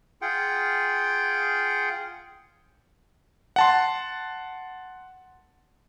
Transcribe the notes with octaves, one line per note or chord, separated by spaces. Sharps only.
F4 G#4 F#5 G5
F#5 A5 C6